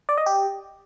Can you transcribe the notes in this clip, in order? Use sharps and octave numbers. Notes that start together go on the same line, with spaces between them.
D5
D#5
G4